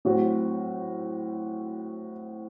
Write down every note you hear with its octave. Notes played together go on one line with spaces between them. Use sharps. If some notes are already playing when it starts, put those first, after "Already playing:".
A2 F#3 C4 F#4